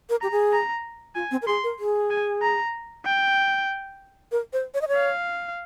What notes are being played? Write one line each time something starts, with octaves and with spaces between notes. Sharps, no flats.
A#4
G4 A#5
G#4
A#5
F4 G#5
C4
A#4
G#4 C6
A#4
G#4
G#5
A#5
G5
A#4
C5
C#5
D#5
C#5
F5